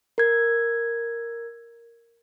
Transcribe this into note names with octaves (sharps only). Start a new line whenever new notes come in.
A#4 G#6